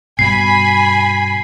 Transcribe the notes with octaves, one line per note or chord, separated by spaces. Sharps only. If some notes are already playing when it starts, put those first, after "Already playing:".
G2 B2 G#5 B5 B6 C7